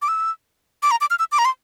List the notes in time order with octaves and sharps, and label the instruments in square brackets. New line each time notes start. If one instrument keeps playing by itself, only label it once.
[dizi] D6
E6
D6
A#5
D6
F6
E6
D6
A#5
C6